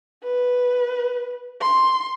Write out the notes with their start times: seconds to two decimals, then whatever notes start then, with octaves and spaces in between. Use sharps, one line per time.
0.23 B4
1.61 C6